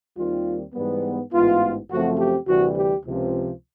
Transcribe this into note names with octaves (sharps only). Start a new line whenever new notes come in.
D#2 D#3 G3 C4 F4
G#2 E3 G3 B3
A1 G#2 E3 G#3 B3 F4
F#2 C#3 F3 A3 C4 F#4
G4
D2 C3 E3 G3 F#4
G4
C#2 C3 F3